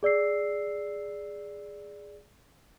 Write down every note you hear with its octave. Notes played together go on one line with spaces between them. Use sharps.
G#4 D5 E6 C7